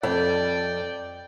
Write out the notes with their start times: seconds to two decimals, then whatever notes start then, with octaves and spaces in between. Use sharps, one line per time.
0.03 F2 D5 G5